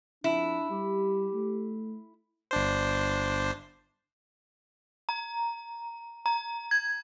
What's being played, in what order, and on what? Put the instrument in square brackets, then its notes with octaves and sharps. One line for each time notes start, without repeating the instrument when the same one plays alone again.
[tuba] F2 [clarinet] D4 [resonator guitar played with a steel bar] E4
[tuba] G3 [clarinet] G4
[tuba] A3
[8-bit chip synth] G1 D4 C5
[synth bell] A#5
A#5
G#6